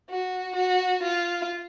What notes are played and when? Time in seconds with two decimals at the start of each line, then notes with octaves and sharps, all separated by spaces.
0.10 F#4
0.56 F#4
1.02 F4